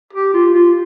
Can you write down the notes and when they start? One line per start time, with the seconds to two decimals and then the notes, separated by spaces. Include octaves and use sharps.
0.13 G4
0.34 F4
0.54 F4